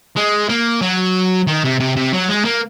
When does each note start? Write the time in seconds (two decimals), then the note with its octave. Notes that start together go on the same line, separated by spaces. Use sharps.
0.16 G#3
0.49 A#3
0.81 F#3
1.47 D#3
1.64 C3
1.80 C3
1.96 C3
2.13 F#3
2.29 G#3
2.45 A#3